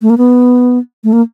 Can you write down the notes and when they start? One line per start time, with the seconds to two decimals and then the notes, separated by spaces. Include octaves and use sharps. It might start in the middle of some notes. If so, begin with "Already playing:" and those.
0.02 A3
0.10 A#3
0.18 B3
1.04 A3
1.13 A#3